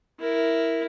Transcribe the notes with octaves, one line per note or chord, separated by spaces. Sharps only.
E4 A#4